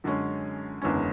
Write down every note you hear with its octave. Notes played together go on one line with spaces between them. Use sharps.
F#2 D3 G#3 C#4
F#1 E2 D3 G#3 C#4